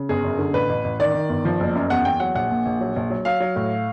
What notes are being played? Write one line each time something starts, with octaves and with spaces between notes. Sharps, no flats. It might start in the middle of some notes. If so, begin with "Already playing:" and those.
Already playing: C#3
G1 G#4
F#2
D3
A1 B4
A1
A1
D#3 D5
D#3
G1
F3
F#1
F#2
E2 F#5
E2 G5
F#3 F#5
A#1 F#5
A#2
A#1
F#3
A#1
F#3
F#3 F5
F#3
A2